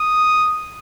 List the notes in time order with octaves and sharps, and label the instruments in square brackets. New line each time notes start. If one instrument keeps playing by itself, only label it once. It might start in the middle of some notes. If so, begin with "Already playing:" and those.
Already playing: [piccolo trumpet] D#6